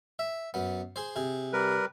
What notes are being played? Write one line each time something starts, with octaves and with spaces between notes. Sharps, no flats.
E5
F#2 B3
G#4 C5
C3 G#4
G3 A#4 B4